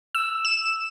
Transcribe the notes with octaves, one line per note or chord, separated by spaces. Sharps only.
E6
E7